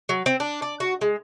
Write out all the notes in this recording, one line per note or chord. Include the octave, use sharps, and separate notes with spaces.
F#3
C4
D4
D5
F#4
G#3